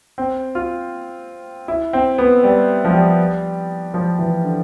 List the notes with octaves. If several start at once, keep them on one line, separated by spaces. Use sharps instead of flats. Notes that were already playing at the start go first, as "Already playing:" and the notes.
C4
F4
E4
C4
B3
G3
F3
G3
F3
E3
D3